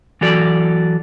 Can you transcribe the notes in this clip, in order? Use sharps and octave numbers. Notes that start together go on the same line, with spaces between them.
E3 F#3 F#4 A4 D5